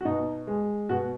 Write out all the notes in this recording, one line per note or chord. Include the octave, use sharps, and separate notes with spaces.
F#4
B2 D#4
G#3
B2 F#4